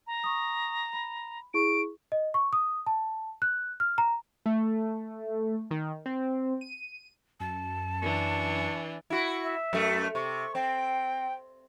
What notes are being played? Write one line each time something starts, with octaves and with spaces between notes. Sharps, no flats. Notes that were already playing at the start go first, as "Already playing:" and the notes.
A#5
C#6 D#6
B5
E4 G#4 C#6 D7
D#5
C#6
D#6
A5
F#6
F6
A#5
A3
D#3
C4
D#7
F#2 A5
E3 D4 C#6
E4 F#4
E5
F#2 A3
C3 C#6
C4 G5